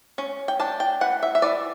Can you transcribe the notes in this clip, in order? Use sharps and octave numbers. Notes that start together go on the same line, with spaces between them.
C#4
G5
D4 A5
G5
E3 F#5
E5
E5
E3 D5